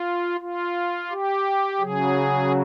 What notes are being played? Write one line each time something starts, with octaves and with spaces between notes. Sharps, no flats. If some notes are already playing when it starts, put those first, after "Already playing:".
Already playing: F4
F4
G4
C#3 F#3 G#4